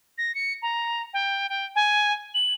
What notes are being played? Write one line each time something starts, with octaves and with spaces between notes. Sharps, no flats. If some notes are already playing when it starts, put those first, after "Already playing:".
A#6
C#7
A#5
G5
G5
G#5
F#7